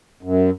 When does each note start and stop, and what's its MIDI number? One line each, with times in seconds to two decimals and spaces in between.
0.23 0.50 42